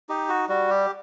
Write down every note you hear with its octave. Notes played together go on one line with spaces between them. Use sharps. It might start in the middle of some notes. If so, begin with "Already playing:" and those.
D#4 G4
F#4
G3 F#4
G4